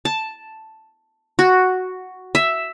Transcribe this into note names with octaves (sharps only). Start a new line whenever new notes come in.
A5
F#4
E5